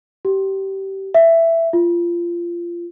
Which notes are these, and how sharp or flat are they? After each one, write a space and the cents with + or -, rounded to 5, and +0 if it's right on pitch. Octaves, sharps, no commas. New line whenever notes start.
G4 -20
E5 +10
F4 -20